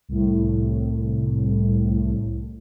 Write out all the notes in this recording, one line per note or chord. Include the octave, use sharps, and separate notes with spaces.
C2 A2